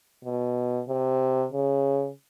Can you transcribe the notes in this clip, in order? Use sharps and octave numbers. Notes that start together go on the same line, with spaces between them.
B2
C3
C#3